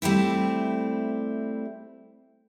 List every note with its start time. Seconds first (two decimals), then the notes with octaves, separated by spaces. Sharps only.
0.02 G3 A3 C4 E4